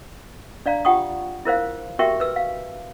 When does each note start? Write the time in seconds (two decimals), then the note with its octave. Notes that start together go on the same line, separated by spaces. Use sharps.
0.66 D4 D5 F5 A#5
0.85 F4 G4 F#5 G5 C#6 D#6
1.45 E4 A#4 C5 F5
1.99 F#4 G4 A#4 E5 G5 C#6
2.20 B4 E6
2.36 F5